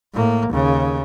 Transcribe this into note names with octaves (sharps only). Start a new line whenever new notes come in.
A2 A#3
D#2 C#3